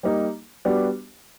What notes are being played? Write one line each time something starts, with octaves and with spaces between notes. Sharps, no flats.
G3 A#3 D#4
G3 B3 D4 F#4